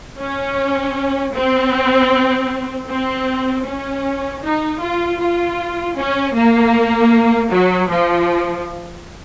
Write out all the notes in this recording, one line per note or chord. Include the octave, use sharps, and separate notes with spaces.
C#4
C4
C4
C#4
D#4
F4
F4
C#4
A#3
F#3
F3